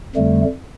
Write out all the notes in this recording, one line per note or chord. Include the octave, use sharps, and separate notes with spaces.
F2 D3 G3 A3